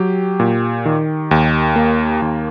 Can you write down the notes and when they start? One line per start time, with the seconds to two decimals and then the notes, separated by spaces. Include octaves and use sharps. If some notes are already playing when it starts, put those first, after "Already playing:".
Already playing: F#3 G4
0.40 A#2
0.86 D#3
1.31 D#2
1.76 A#3
2.22 D#2